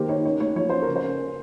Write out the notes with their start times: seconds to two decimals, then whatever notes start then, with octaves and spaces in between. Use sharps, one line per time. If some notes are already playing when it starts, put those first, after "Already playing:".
Already playing: D#3 A#3 G4 A#4 C5
0.09 D#4 C#5
0.25 C#4 C#5
0.40 A#3 C#5
0.56 F3 C#5
0.69 C#4 C5
0.82 A#4
0.87 C#3
0.96 C5
1.04 C#4
1.19 C#4